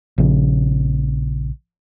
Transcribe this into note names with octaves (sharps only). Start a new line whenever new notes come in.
A#1 C#3